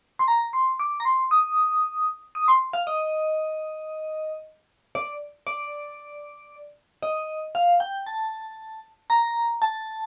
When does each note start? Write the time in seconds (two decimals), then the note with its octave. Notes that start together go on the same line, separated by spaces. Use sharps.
0.19 C6
0.28 A#5
0.53 C6
0.79 D6
1.00 A#5
1.05 C6
1.31 D#6
2.35 D#6
2.48 C6
2.73 F5
2.87 D#5
4.95 D5
5.47 D5
7.03 D#5
7.55 F5
7.80 G5
8.06 A5
9.10 A#5
9.62 A5